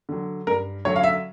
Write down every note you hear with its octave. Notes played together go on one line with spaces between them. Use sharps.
D3 F#3
G2 A#4
D3 F#3 C#5
F5
E5